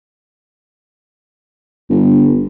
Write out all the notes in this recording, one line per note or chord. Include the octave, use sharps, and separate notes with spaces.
G1